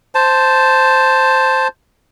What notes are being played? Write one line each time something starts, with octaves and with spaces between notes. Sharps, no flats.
C5 A5